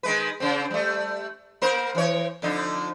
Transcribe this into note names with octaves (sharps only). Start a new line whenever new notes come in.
D#3 G#3 B4
C#3 C4
G3 A3
A#3 A#4 C5
E3 C#5
F2 D3 D#4